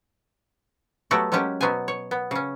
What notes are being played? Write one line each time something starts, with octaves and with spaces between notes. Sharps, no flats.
F#3 A3 B3 F#4 G4 D5
F#3 G#3 A#3 C#4 G4
B2 F#3 B3 C5 G#5
C#5
B3
C#3 C#4